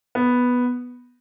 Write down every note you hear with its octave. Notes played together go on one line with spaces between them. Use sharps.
B3